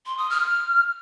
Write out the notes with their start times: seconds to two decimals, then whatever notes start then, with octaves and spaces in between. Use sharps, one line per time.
0.06 C6
0.18 D#6
0.30 F6